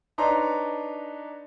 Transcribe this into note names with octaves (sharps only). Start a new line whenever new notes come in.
D4 D#4 B4 C#5 A#5 C6